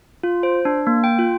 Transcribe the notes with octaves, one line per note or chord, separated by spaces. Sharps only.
F4
C5
D4
A#3
G5
F4